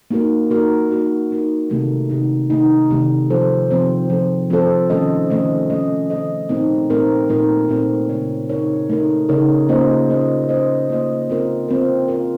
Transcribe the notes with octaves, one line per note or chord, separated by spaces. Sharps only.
A#3 D#4 F#4 A#4
A#3 D#4 F#4 A#4
A#3 D#4 F#4 A#4
A#3 D#4 F#4 A#4
C3 D#3 A3 D#4
C3 D#3 A3 D#4
C3 D#3 A3 D#4
C3 D#3 A3 D#4
F3 C4 F4 A4 C5
F3 C4 F4 A4 C5
F3 C4 F4 A4 C5
F3 C4 F4 A4 C5
D#3 A3 C#4 A4 D#5
D#3 A3 C#4 A4 D#5
D#3 A3 C#4 A4 D#5
D#3 A3 C#4 A4 D#5
A#2 A3 C4 D#4 A#4
A#2 A3 C4 D#4 A#4
A#2 A3 C4 D#4 A#4
A#2 A3 C4 D#4 A#4
C#3 A3 D#4 A#4 C#5
C#3 A3 D#4 A#4 C#5
C#3 A3 D#4 A#4 C#5
C#3 A3 D#4 A#4 C#5
A#3 C#4 F4 C5 D#5
A#3 C#4 F4 C5 D#5
A#3 C#4 F4 C5 D#5
A#3 C#4 F4 C5 D#5
C4 F4 A#4
C4 F4 A#4
C4 F4 A#4